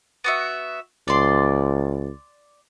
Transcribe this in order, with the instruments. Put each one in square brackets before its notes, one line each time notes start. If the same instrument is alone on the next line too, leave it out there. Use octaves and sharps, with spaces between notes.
[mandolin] B3 F#4 E5
[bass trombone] C#2 [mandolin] D5 C6